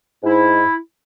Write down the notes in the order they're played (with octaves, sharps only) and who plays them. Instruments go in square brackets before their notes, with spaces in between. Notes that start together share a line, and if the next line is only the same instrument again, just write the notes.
[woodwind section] G#2 E4